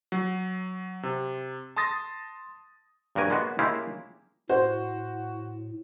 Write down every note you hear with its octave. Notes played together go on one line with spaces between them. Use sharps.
F#3
C3
A5 C6 D#6 A6 A#6
A#1 G2 F#4 A#4 G#5
G#3 A#3 B3 F#4 C#5
G#3 A#3 C#4 E4 F4 G4
A2 F#4 C5